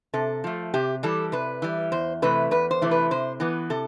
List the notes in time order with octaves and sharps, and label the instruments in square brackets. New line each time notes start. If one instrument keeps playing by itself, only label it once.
[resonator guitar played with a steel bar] C3 A4
F3 A3
C3 G4
E3 G3 A4
C3 B4
E3 G3
E2 C5
C3 E3 A3 B4
E2 B4
C5
C3 E3 A3
B4
C3 C5
E3 B3
C3 A4